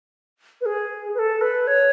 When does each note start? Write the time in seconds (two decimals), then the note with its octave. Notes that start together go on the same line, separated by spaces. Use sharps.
0.61 B4
0.66 G#4
1.15 B4
1.19 A4
1.41 B4
1.67 C#5